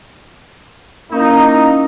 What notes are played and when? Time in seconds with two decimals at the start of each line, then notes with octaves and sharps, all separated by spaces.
1.13 A#3 C#4 D#4 E4